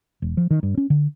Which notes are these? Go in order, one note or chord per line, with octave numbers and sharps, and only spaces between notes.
E1
F3
D#3
G2
C#4
D3